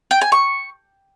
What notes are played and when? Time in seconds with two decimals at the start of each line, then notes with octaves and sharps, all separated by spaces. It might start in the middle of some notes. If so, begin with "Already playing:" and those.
0.11 G5
0.21 G#5
0.32 C#6